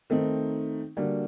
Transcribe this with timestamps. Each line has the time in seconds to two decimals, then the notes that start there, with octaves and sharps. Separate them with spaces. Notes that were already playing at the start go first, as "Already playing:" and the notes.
0.10 D#3 A3 C4 D#4
0.97 D3 G3 A#3 F#4